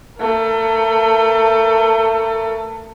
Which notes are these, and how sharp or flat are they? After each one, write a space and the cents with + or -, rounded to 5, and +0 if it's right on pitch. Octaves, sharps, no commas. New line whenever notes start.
A3 +30 A#4 +25